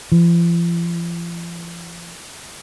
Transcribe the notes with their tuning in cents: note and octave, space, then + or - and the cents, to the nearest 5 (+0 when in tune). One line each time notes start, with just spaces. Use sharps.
F3 -40